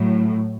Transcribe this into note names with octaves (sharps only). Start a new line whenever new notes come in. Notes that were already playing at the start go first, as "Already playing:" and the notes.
Already playing: A2 F#3